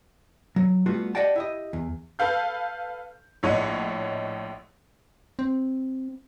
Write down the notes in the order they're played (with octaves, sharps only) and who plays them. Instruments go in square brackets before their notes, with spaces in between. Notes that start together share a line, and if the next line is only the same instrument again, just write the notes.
[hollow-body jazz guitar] F#3
G3 A3 B3 F4 F#4
G4 D5 D#5 F#5 G5 A5
E4 G4 D#5
E2
[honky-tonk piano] A4 B4 F5 G6
A#1 A2 C#5 D#5 F#5 D#7
[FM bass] C4